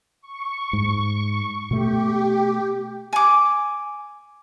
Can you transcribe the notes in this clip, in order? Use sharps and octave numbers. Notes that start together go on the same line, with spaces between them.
C#6
G#2
B2 A3 G4
G#5 D6